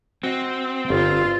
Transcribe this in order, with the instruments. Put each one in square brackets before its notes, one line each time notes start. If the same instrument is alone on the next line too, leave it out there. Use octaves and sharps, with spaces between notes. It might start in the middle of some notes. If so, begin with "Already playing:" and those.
[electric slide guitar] C4 [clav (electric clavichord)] F#4 D#5
[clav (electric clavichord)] G1 [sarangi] F4